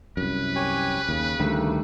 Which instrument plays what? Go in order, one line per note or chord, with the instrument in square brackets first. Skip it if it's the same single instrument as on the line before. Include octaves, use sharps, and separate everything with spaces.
[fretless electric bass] C2 F#2 [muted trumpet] B4
[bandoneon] G4 C#5 G#5
[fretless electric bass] D#2 [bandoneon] C#3
[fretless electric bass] D2 [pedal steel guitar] D#3 G3 A3